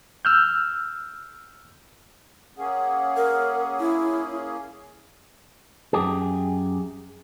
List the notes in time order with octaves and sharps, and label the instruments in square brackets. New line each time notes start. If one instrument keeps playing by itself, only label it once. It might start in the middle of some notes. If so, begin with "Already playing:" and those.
[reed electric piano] E6 F6 G6
[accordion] A#3 C#4 G#4 [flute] F#5
[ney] A#4
E4
[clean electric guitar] F#2 G4 G#4